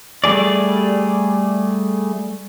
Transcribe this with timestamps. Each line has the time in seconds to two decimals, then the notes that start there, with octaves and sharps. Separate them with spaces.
0.24 G3 A3 G#4 D5